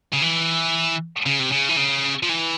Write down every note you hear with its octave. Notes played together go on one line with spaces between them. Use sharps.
C#3
E3
C#3
C3
C#3
E3
C#3
F3
E3